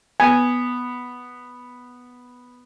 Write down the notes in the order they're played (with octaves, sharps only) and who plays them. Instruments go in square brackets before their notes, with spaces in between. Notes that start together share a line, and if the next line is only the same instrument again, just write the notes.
[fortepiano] B3 [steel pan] G#5